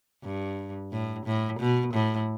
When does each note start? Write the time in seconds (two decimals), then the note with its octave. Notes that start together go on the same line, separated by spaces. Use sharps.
0.24 G2
0.92 A2
1.26 A2
1.60 B2
1.94 A2